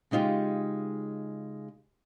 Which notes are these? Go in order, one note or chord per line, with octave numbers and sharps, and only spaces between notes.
C#3 G#3 D#4 F4 G4